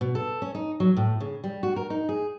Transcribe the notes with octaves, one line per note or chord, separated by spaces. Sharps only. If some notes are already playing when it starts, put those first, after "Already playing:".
B2
A4
C#4
D#4
F#3
A2
C#3
G3
F#4
A#4
D#4
G#4